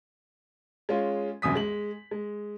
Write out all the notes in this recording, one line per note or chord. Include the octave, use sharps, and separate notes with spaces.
G#3 C#4 F4
E1 C2 F#2 D#6 B6
G#3 F#7
G#3